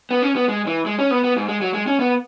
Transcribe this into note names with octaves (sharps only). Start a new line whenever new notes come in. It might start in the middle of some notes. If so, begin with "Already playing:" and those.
B3
C#4
B3
G#3
E3
G#3
C#4
B3
B3
G#2
G#3
F#3
G#3
C#4
B3